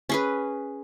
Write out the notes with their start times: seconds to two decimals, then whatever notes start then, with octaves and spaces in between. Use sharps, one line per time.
0.09 C#4 G#4 B4